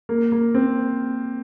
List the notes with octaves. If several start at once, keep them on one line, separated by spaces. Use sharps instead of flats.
A#3
A#3
C4